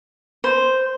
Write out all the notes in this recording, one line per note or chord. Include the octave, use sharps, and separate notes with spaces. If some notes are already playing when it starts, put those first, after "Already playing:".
C5